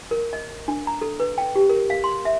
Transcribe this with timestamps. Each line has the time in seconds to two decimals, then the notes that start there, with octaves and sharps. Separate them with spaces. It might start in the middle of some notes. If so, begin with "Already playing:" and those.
0.11 A#4
0.33 D#5
0.68 D4
0.87 A#5
1.01 A4
1.20 B4
1.38 G5
1.55 G4
1.69 A#4
1.90 F5
2.04 C6
2.25 E5